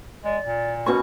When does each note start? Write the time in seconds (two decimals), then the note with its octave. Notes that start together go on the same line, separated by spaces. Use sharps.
0.25 G#3 D5
0.46 A#2
0.86 B2 C#4 F#4 C#6